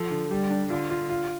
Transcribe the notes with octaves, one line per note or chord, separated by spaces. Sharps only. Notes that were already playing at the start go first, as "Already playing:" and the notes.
Already playing: F3 A4
D3
G3 G4
D4
D3 F4
F4
F4